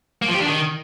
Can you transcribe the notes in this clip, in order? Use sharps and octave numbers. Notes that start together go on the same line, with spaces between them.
A#3
F3
G4
D4
D#3